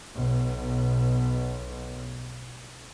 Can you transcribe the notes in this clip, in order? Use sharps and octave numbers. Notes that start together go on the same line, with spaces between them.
B1 B2